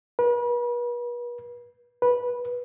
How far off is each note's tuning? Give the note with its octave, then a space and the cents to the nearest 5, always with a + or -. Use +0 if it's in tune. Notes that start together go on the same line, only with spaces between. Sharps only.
B4 -40
B4 -15